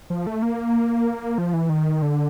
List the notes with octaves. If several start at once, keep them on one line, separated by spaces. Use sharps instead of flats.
F3
A3
A#3
F3
E3
D#3
D3